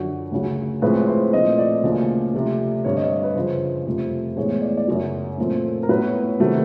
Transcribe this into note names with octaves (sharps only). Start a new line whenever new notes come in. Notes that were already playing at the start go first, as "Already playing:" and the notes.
Already playing: F#2 D3 F3 F#4
D2 C#3 F#3
A2 F3 G#3 C4 B4
C5
A#2 F3 A3 C4 D#5
D5
D2 C#3 F3 A#3 C#4
C3 F3 A3 C4
G2 D3 G3 C4 C#5
D#5
B4
F#2 C#3 F3 C5
F2 C3 F3 A3
A2 E3 G#3 B3 C#5
D5
D5
F#2 C#3 F#3 C#5
A#2 F3 A3 C4
A#4
A2 F#3 B3 B4
C3 D#3 F#3 A3 C4